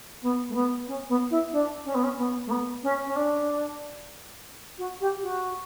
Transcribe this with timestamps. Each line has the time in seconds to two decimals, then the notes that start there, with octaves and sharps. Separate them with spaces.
0.22 B3
0.48 A3
0.54 B3
0.87 C#4
1.08 B3
1.30 E4
1.52 D4
1.85 C#4
1.94 B3
2.03 C#4
2.17 B3
2.46 A3
2.50 B3
2.83 C#4
3.06 C#4
3.15 D4
4.78 F#4
5.00 G4
5.22 F#4